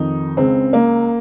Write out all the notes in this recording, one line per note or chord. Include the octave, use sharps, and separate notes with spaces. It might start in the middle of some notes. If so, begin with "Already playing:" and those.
Already playing: F2 D#3 D#4
C#2 C#3 C4
A#3